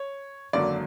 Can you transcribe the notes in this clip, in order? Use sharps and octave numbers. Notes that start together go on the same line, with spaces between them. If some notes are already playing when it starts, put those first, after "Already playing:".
Already playing: C#5
G#1 F#2 D3 F#3 A#3 D5